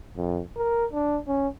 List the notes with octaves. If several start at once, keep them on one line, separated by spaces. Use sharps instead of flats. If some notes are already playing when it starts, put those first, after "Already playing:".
F2
A#4
D4
C#4